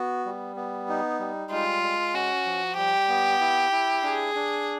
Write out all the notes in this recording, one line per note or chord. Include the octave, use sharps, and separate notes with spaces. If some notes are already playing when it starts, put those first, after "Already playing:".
Already playing: B3 F#4
G3
B3
D#4
G3
G#3 F4
G#3
C#4 F#4
F3
G3 G4
B3
E4
E4
D4 G#4
D4